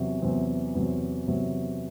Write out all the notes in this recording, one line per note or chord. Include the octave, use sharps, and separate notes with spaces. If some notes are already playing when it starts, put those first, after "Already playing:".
Already playing: E2 C3 F#3 C4
E2 C3 F#3 C4
E2 C3 F#3 C4
E2 C3 F#3 C4